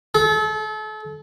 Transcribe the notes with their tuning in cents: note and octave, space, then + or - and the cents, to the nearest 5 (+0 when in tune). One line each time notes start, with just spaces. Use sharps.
A4 -35